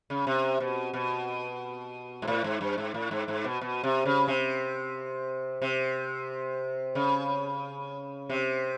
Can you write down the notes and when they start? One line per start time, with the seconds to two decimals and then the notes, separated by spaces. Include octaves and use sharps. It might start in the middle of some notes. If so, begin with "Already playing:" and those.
0.10 C#3
0.27 C3
0.60 B2
0.94 B2
2.22 G#2
2.28 A2
2.44 G#2
2.61 G2
2.78 G#2
2.94 A2
3.11 G#2
3.28 G#2
3.44 B2
3.61 B2
3.84 C3
4.05 C#3
4.28 C3
5.62 C3
6.95 C#3
8.29 C3